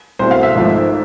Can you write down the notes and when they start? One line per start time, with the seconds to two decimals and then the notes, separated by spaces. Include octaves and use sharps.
0.19 C2 B2 A3 C5
0.31 F5
0.43 E5
0.55 G#1 G#2 F3 A3